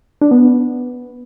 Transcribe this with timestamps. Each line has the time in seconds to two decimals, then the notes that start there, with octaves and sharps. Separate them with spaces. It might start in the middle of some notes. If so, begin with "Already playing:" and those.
0.21 D4
0.31 B3